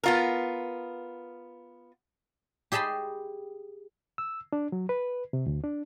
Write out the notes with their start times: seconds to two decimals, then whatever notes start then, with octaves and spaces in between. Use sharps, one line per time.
0.03 B3 F4 A#4
2.72 G4 G#4 D#5 A5 B5 C6
4.18 E6
4.53 D4
4.72 F#3
4.89 B4
5.33 C3
5.46 D2
5.64 D4